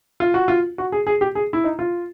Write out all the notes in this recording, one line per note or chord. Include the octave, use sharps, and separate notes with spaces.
F4
F#4
F4
F#4
G#4
G#4
G4
G#4
E4
D#4
F4